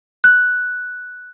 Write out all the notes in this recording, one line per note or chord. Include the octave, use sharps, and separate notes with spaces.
F#6